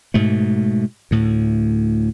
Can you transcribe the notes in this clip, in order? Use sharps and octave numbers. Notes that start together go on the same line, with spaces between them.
G#2 B2 A3
D2 A2